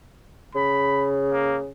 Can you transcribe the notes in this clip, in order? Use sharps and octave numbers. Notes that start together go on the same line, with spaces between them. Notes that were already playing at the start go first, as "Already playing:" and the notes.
C#3 B5
A#3